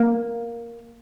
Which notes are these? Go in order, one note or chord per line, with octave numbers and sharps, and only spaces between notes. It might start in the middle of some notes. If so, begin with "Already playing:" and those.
Already playing: A#3